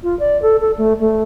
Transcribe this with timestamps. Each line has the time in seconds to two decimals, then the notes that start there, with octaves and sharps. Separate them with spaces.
0.03 F4
0.19 D5
0.42 A4
0.61 A4
0.77 A3
1.00 A3